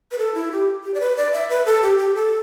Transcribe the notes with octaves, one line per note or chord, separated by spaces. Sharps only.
B4
A4
E4
G4
G4
D5
B4
D5
E5
B4
A4
G4
G4
A4